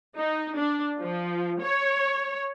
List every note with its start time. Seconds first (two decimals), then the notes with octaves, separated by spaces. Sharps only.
0.16 D#4
0.56 D4
1.00 F3
1.61 C#5